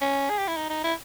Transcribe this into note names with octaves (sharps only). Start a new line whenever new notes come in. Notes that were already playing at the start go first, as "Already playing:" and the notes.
C#4
G#4
G4
E4
D#4
D#4
E4